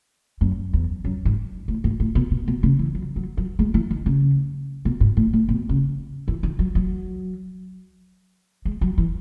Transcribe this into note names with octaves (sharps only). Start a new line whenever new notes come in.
F#2
E2
F#2
G#2
A2
G#2
A2
B2
B2
B2
C#3
E3
F#3
F#3
F#3
G#3
E3
D#3
C#3
B2
G#2
A2
A2
B2
C#3
E3
D#3
F#3
F#3
G#3
F#3
E3